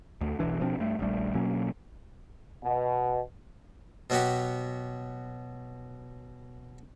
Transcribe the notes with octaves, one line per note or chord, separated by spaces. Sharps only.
D2
E1 B1 E3 D4
B2 F3 C4 D4
G2 A3
D#1 A#1 G3 A3
B2 F#3 A#3 C#4
B2
B2 F#3 B3 F#4 G4